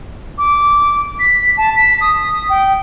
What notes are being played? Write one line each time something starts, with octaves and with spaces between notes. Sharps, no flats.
D6
B6
A5
B6
D#6
G5